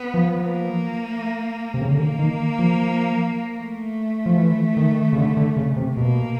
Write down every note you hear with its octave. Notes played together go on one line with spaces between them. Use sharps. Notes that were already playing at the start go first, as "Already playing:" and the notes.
Already playing: B3
F3
A#3
C3
C#3
D3
D#3 A#3
D#3
F3
A3
F3
E3
D#3
C#3
D3
D3
C#3
C3
B2 A#3